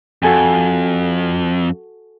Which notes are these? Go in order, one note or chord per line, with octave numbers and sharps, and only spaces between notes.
F2 F#4 A4 G#5